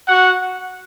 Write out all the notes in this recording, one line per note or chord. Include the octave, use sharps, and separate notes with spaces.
F#4 F#5